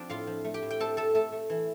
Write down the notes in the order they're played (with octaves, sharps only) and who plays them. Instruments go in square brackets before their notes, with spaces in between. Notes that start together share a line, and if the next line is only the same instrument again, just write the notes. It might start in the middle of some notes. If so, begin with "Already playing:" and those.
Already playing: [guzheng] F3 C4 D4 D5
A2 F4 F5
F3
A3
G4 G5
A2
G5
C4 A4 A5
A3 A4 A5
A3 A4 A5
A3
E3